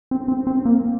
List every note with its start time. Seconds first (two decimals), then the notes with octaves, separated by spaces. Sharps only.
0.11 C4
0.28 C4
0.47 C4
0.65 A#3